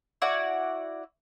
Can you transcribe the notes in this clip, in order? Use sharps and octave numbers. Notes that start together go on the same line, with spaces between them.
E4 F#4 D5 F#5